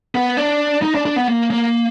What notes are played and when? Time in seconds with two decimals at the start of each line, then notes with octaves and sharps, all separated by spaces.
0.15 B3
0.37 D4
0.82 D#4
0.95 D4
1.05 D4
1.16 B3
1.28 A#3
1.51 A#3